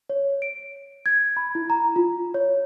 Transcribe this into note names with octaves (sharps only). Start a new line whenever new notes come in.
C#5
D7
G#6
B5
E4
A#5
F4
C#5